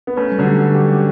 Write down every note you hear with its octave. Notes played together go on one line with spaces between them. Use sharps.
B3
A3 C#4 B4
G3
D3 F#3
G4
C#4
G4
G4